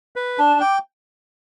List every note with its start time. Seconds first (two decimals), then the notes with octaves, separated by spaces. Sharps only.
0.16 B4
0.38 D4 A5
0.61 G5 D6